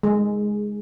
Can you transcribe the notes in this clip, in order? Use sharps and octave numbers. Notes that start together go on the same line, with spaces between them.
G#3